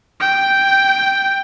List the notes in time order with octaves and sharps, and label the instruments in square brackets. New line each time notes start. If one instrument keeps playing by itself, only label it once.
[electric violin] G5